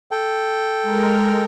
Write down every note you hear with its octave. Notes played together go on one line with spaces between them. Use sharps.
A4 G5
G#3 A#4